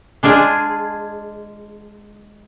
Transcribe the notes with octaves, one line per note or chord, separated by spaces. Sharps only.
G#3 D4 F4 G#4